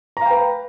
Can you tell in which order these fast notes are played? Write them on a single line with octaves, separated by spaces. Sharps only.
A#5 F5 G5 B4